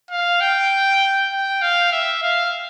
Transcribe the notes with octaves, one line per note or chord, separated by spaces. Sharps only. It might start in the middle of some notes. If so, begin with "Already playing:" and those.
F5
G5
G5
F5
E5
F5